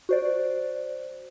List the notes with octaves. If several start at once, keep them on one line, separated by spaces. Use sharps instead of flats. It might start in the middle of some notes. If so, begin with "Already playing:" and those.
F#4 C5 D5